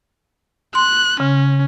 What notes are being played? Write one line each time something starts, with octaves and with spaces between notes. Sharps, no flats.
C6 F#6
C#3 C#4